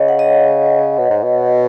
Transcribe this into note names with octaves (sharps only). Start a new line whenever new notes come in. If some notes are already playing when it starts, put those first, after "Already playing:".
Already playing: C#3 C#5 D#5
F#5
D#5
B2
G#2
B2